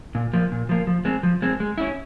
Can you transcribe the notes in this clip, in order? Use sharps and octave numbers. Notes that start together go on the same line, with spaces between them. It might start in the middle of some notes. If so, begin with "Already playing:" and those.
A#2
F3 A#3
A#2
F3 A#3
F3
G#3 C4
F3
G#3 C4
G#3
C#4 E4